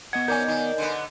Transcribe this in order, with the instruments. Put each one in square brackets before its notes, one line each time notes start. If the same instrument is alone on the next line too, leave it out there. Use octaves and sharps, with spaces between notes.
[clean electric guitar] B3 D#5 F#5 [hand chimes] G#6
[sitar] D#3 C#4 [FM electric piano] A#4 D5 G#5 [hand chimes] G6
[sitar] D#3
D3 B3